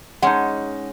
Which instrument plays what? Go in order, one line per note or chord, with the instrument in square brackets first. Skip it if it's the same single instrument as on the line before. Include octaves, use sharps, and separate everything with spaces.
[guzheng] G#3 C#4 [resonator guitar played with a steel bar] D#4 F#5